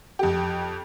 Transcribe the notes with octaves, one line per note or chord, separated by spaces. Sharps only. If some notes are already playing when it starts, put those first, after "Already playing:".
F2 G4